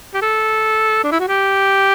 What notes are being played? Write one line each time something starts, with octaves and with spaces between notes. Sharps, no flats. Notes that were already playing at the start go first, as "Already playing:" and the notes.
G4
A4
D4
E4
F#4
G4